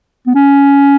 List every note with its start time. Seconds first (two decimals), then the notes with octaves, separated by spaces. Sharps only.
0.27 B3
0.35 C#4